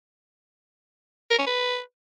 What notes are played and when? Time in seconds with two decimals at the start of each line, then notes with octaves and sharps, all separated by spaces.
1.31 A#4
1.39 C#4
1.47 B4